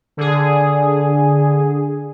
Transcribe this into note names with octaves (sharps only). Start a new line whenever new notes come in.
D3 G#4